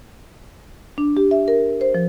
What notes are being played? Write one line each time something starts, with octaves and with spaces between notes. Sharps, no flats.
D4
G4
E5
A#4
C5
F3